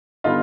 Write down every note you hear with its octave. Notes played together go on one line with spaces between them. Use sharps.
D3 G3 B3 D#4 F4